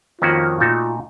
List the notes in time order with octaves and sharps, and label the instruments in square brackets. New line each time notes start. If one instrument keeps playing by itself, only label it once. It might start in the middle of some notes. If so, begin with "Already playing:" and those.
[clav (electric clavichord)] F2 D#3 A#3 C#4 F#4 [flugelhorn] F4
[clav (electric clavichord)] A#2 A3 D#4 F#4 A4 [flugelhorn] F4